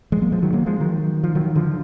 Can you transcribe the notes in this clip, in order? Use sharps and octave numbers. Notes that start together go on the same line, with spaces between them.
F3 G#3
F#3 A#3
F3 G#3
D#3 F#3
F#3 A#3
F3 G#3
D#3 F#3
F3
D#3 F#3
D3 F3